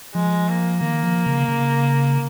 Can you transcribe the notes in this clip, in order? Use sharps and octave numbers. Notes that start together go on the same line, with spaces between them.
F3 G#3
A#3
D#3 A#3
F3
C#3
C#3